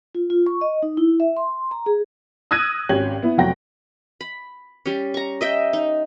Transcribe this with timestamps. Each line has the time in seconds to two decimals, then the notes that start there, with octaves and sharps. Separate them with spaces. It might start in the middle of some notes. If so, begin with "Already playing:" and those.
0.15 F4
0.30 F4
0.47 C#6
0.61 D#5
0.83 D#4
0.97 E4
1.20 E5
1.37 C6
1.71 A#5
1.86 G#4
2.51 D#6 E6 F#6 G#6 A#6 D#7
2.89 G#1 C#4 G4 G#6 F#7
3.22 B3 E4
3.38 F1 F#3 F#5 G5 A#6
4.21 B5
4.86 G3 C#4
5.14 A#5 C#6
5.41 D#5 E5 G5
5.73 D#4